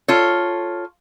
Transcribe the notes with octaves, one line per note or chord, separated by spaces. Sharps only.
F4 A4 C#5